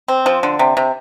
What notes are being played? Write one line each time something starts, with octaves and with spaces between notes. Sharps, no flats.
C4
F3
D3
C3
C3